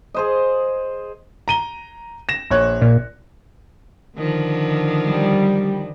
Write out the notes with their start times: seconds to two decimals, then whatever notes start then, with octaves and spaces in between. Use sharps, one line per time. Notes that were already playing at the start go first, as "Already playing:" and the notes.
0.14 G#4 C5 D#5
1.48 A#5 D#7 G7
2.29 A#6 E7
2.50 A#1 C#5 F#6
2.82 A#2
4.17 D3 D#3 F3
5.07 G3